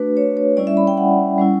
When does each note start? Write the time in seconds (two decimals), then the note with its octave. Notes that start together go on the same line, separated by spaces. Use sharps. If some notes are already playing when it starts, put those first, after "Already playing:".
Already playing: A3 D4 F#4 B4
0.17 C#5
0.37 C#5
0.57 G3 C#4 E4 D5
0.67 E5
0.77 B5
0.87 G5
0.97 F#5
1.38 G3 C#4 E4